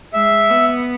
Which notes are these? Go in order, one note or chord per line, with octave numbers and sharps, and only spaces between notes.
G#3 E5
B3